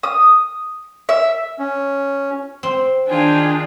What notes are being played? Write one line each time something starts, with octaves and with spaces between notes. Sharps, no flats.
D#6
E5
C#4
C4
D#3 D4 F4 G#4 G5 G#5